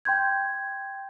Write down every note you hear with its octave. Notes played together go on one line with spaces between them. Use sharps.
G5 C6 G6 G#6